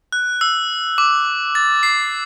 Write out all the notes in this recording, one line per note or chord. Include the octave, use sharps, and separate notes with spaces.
F#6
E6
D6
A6
C7